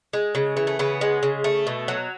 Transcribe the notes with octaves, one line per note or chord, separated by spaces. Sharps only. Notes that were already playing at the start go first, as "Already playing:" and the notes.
G#3
C#3
E3
A3
C#3 B3
G#3
C#3
A3
B2
F#3